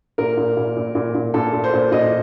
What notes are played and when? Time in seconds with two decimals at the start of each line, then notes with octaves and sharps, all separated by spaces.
0.18 A#2 A#4
0.37 A#2
0.57 A#2
0.77 A#2
0.95 A#2
1.15 A#2
1.34 A#2 A4
1.53 A#2
1.64 C5
1.73 A#2
1.92 A#2 D#5